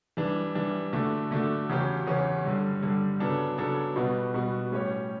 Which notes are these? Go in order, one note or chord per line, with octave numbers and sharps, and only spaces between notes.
E3 G3 D4
E3 G3 D4
D3 A3 D4 F#4
D3 A3 D4 F#4
E2 C#3 F#3 C#4 G4
E2 C#3 F#3 C#4 G4
G2 D3 G3
G2 D3 G3
C#3 F#3 B3 D4 A4
C#3 F#3 B3 D4 A4
B2 G3 B3 F#4
B2 G3 B3 F#4
A2 G3 C#4 G4 C#5